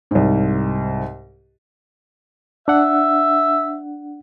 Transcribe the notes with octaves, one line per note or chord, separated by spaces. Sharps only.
C2 G#2
D4 E5 F#5